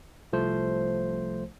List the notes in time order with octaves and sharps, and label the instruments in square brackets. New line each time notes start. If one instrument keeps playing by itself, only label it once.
[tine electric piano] C2 F3 A3 C5